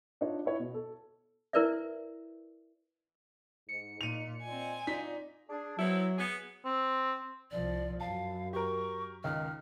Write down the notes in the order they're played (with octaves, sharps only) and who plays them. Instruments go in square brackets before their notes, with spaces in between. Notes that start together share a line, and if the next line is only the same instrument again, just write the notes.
[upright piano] D4 D#4 F4 C#5
E4 B4 C#5
B2
A4
[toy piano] E4 A#4 B4 D5 E5
[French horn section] G#2 [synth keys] C#7
[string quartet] A#2 [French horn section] D#4 [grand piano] D#7 F7
[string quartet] C4 G#5 [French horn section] F4 D5 D#5
[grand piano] D#4 B6 [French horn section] F4 D5
[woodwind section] D4 G#4
[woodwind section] F#3 [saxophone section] B3 C4 E4
[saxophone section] B3 G#4
[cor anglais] C4
[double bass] C2 F3 [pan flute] D5
[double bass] F#2 [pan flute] F5 [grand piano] A5
[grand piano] G4 A#4 [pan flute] C#6
[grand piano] C#2 D#3 [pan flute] F6